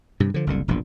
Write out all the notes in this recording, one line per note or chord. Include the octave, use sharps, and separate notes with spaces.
G2 C3
D3 F3
F#1 C2 D3
E1 A#1 G2 A#2